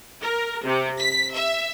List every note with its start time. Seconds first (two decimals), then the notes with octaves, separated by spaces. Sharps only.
0.22 A#4
0.65 C3
1.00 B6
1.34 E5